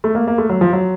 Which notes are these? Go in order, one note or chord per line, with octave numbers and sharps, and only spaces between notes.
A3
A#3
A#3
A3
F#3
F3
F#3